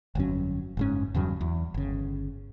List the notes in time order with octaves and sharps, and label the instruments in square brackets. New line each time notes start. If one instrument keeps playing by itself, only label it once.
[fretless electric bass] G1 F2 F#3 C#4
F#1 G#2 C#4
E2 G2 C#3 F#3
E2
G1 C#3